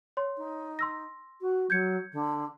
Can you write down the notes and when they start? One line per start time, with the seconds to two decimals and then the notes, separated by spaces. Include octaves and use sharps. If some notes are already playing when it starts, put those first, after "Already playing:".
0.17 C#5 C6
0.37 D#4
0.79 C6 E6 A#6
1.41 F#4
1.70 F#3 G6 G#6 C#7
2.13 D3